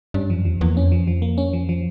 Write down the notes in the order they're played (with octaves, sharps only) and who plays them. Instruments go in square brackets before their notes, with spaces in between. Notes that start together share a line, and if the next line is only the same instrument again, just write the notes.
[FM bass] G2 [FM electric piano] C#4
[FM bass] F#2 [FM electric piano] F3
[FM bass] E2 [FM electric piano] F3
[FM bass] E2 [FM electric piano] A#3
[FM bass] F2 [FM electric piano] C#4
[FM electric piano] F3
F3
A#3
C#4
F3
F3